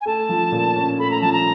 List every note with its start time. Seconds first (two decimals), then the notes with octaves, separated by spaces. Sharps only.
0.01 G#5
0.06 A3 A5
0.29 F3
0.52 A#2
0.76 C#4
0.99 A3 B5
1.11 A#5
1.21 F3 A5
1.33 A#5